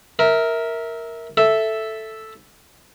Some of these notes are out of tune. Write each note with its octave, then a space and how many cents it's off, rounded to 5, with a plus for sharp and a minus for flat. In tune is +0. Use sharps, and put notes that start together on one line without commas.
A#4 +0 E5 -20
A4 +0 E5 +0